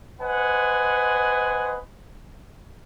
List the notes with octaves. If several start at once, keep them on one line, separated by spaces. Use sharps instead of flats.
B4 C5 D#5 F#5 G#5